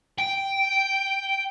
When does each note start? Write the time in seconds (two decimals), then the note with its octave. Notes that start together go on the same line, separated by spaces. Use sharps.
0.19 G5